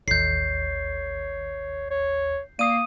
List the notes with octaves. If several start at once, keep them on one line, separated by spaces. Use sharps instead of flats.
A1 D#2 C#5 G6 C7
C#5
A#3 D5 D#6 C7 D#7